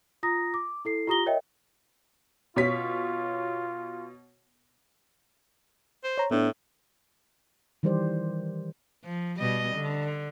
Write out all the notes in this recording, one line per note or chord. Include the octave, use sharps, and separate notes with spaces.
F4 A#5 D#6 A#6
D6
E4 A4 C7
F4 G4 A#5 D#6 A#6 G7
A#4 C#5 D#5 E5 G5
B2 F4 C#5 B6
C5
C#5 A#5
A2 B3 D4
D#3 E3 G3 G4 C5 D5
F3
B2 G3 D#5
D3